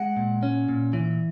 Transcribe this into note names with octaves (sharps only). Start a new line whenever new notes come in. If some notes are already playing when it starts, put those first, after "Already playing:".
Already playing: G#3 F#5
A#2
C#4
A#2
E3